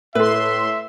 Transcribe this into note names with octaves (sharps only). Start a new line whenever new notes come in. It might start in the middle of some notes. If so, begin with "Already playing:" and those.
A2 A4 B4 E5 C6